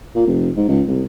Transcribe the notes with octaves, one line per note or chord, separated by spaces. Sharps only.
A#2
F1
G#2
C#2
C2